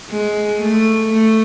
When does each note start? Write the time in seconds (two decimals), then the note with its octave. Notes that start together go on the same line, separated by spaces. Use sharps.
0.10 G#3
0.62 A3
1.14 A3